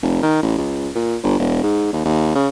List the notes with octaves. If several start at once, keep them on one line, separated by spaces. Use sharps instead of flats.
F1
D#3
A1
C#2
A#2
G1
E1
G#2
D#2
D#2
C#3